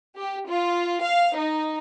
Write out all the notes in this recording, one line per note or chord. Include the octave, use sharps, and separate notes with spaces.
G4
F4
F5
D#4